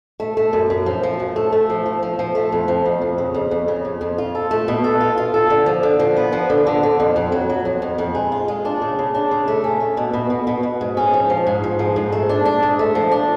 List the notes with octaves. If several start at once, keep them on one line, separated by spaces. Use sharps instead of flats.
A3
A3
F#2
F#2
F3
F3
F#2
A3
A3
F3
F3
F3
F3
A3
F2
F3
F2
F2
C#3
F2
F2
C#3
F2
F2
F4
A4
A3
B2
A4
F4
F4
A4
D3
F3
D3
F3
B3
F3
D3
D3
D3
F2
F2
F#3
F#3
F2
F2
F2
G#3
F4
G#3
D4
C#3
C#3
D4
C#3
A3
C#4
A3
B2
B2
B2
B2
B2
G#2
C#4
F3
F3
G#2
G#2
F3
G#2
A3
D4
D4
G#2
A3
F3
D4